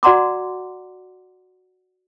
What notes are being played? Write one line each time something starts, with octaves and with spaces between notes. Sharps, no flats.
F#4 D5 F#5 A#5 C6 D6